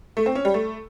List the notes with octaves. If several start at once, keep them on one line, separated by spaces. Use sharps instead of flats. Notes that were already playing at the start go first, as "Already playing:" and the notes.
A3
C4
C#4
G3
A3